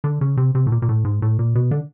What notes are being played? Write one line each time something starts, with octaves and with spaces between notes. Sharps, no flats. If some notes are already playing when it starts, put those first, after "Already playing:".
D3
C#3
C3
C3
A2
A#2
A#2
A2
G#2
A2
A#2
B2
D3